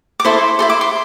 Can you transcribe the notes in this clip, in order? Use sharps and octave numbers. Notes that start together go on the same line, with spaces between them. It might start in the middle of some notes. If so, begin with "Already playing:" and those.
D6
E4 A4 C5 C6
E4 A4 C5 C6
D6
C6